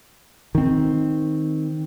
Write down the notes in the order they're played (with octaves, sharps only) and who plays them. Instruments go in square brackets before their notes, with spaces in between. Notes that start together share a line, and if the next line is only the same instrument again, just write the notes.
[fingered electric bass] D#3 C4